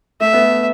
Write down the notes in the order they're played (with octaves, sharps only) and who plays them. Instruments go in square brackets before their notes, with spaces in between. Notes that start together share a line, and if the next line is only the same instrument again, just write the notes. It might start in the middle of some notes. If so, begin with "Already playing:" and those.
[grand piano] A3 [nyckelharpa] E5
[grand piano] B3
A3